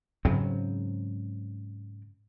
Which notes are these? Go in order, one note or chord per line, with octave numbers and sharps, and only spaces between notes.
G#2 C#3 F#3 C4